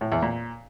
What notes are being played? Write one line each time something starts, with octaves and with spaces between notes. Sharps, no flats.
A2
E2
A#2